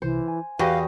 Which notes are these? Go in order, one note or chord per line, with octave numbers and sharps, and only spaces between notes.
C2 C3 E3 C5
G#5
E2 F#4 G4 D#5 F5